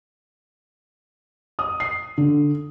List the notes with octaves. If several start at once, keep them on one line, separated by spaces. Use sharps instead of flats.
D#6
C7
D3